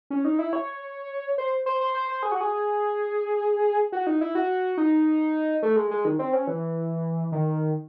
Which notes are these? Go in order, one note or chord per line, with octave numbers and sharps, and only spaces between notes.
C#4
D#4
E4
C#5
C5
C5
C5
C5
C5
G#4
F#4
G#4
F#4
D#4
E4
F#4
D#4
A3
G#3
G#3
D#3
C4
C#4
E3
D#3